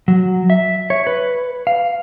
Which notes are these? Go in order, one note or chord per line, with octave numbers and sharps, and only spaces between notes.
F#3
E5
C#5
B4
F5